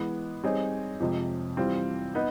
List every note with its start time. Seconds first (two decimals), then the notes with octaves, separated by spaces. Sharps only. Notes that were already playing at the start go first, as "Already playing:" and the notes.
Already playing: E3 G#3 B3
0.43 G3 C4 D#4 G#4 C#5
1.00 F2 C3 F3 G#3
1.57 E3 G3 C4 F4
2.15 B3 D#4